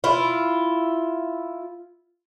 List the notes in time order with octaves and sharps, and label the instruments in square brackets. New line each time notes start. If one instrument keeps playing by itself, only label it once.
[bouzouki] E4 F4